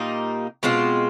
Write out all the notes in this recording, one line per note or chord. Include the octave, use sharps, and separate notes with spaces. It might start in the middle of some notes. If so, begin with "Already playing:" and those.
Already playing: A#2 G3 A#3 D#4
B2 G#3 C4 F4